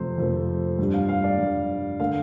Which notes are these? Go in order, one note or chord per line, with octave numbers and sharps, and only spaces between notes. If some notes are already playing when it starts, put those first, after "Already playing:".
Already playing: F2 C3 A3 C5
F2 C3 A3
G2 G3
F5
F5
D5
G2 G3
D3 A3 F5